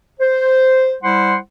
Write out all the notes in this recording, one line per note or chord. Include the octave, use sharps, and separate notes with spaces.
C5
G3 E4 C5 F#5 C6